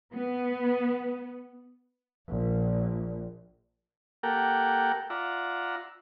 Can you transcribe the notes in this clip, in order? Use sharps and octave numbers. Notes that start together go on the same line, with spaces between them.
B3
A#1 A#2
A#3 G4 A4 A#4 F#5 G5
F4 D5 E5 F#5 A#5